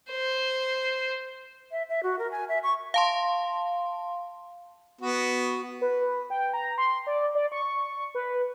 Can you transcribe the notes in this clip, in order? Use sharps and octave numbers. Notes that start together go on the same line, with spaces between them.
C5
E5
E5
F#4
A#4
G#5
E5
C#6
F5 A5 C6
B3 F#4
B4
G5
A#5
C6
D5
D5
C#6
B4